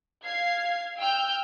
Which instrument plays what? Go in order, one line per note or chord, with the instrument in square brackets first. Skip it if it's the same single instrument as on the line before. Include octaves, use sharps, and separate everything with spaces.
[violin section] F5 G#6 C7
G5 E6 F6 G6